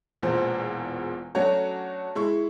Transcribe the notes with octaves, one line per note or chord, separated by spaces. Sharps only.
E1 E2 A#2 C5
F#3 A3 C#4 D4 F#4 C#5
G#3 E4 C#6